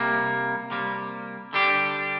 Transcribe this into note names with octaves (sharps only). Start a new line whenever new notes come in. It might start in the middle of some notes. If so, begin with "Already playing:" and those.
Already playing: C3 G3 A#3
C3 G3 A#3
D3 G3 D4 G4